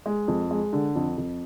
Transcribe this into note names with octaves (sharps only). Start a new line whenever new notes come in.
G#3
F2
G#3
D3
F2
F2